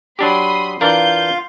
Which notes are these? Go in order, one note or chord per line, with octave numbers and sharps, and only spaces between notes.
F#3 D4 G4 B5 C6 D#6
E3 D4 F4 A#4 F5 G6